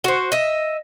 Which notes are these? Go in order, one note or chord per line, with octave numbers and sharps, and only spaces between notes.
F#4 C5
D#5 E5